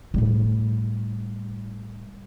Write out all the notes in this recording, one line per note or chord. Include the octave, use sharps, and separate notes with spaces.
A2 G3